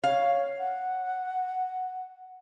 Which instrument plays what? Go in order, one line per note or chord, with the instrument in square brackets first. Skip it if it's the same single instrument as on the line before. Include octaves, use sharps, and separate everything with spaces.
[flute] C#5 [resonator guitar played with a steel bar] F5
[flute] F#5